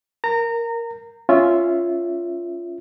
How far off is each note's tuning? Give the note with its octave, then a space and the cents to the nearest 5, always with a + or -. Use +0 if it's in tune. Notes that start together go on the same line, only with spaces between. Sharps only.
A#4 +0 A#5 -25
C#4 +0 F4 -10 E5 +0